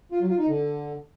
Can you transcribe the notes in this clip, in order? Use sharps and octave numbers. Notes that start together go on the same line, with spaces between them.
F4
F#3
F4
D#4
D3